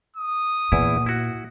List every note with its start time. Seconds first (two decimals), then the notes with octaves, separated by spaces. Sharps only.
0.16 D#6
0.72 E2 A#2 E4
1.06 E4 F#4